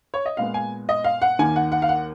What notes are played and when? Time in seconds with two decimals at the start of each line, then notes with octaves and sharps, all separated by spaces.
0.14 C#5
0.26 D#5
0.37 A#2 G#3 B3 F5
0.54 G#5
0.89 D#5
1.04 F5
1.22 F#5
1.39 D#2 D#3 A#3 G#5
1.56 F#5
1.72 F#5
1.82 F5
1.89 F#5